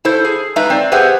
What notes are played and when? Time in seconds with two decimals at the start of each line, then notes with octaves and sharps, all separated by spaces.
0.05 E4 A4 C5
0.25 G#4
0.56 G#3 D#4 B4 E5
0.70 C4 D5
0.92 G4 G#4 B4 C5 E5 F#5